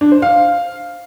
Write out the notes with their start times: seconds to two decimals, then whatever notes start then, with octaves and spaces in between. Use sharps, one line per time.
0.01 D4
0.12 C5
0.22 F5